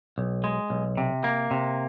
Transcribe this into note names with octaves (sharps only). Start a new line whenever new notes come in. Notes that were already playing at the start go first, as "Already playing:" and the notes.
B1
G#3
B1
C3
A#3
C3